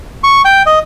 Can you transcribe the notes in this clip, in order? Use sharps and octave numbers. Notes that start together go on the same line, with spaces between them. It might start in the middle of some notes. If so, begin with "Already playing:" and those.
C#6
G5
D#5